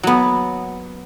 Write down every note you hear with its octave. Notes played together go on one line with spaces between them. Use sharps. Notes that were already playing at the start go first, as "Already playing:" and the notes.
F#3 B3